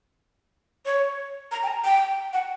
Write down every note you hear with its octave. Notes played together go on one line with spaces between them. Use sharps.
C#5
A#5
G5
A#5
G5
F#5